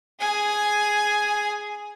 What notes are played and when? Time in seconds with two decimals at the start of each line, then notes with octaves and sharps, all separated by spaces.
0.20 G#4 G#5